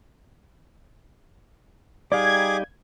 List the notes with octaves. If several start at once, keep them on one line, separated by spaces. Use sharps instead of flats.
G3 D#4 G4 G#4 D5 F5 D6 G#6